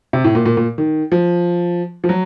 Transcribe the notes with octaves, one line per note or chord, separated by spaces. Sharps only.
C3
A2
A#2
A#2
A#2
D#3
F3
F3
F#3